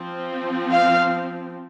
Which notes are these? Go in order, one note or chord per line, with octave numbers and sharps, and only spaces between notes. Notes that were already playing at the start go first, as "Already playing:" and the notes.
Already playing: F3 C4
F5